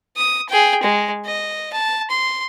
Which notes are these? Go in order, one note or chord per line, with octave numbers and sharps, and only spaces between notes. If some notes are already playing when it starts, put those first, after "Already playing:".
D#6
G#4 G5
G#3
D#5
A5
C6